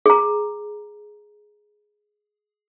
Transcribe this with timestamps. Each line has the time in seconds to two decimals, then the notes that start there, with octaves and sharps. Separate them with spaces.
0.06 G#4 A#5